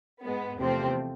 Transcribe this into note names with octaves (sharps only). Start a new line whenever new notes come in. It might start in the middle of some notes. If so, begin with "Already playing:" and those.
G#2 G#3 B3
E2 C3 F3 A3 C4